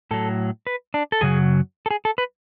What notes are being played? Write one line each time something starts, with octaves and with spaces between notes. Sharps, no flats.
A2 F#3 A4
B4
D4
A4
F#2 C#3 F#3 G#4
A4
G#4
A4
B4